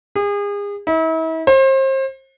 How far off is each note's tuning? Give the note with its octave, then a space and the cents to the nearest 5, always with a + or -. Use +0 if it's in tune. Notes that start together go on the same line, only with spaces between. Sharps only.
G#4 -35
E4 -40
C5 +35